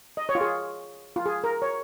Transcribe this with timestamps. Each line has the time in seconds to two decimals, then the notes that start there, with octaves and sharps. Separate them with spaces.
0.17 D#5
0.29 C#5
0.35 F4
0.41 G#4
1.16 F4
1.26 G#4
1.44 A#4
1.62 C#5